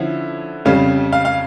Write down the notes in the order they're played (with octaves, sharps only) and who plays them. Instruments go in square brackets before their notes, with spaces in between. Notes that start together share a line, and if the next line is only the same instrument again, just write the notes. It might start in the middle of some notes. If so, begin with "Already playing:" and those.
Already playing: [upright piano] D3 F3 C#4 E4
F2 C#3 G3 C#4 F5
F5
F5